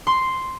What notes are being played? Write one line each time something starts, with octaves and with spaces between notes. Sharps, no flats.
C6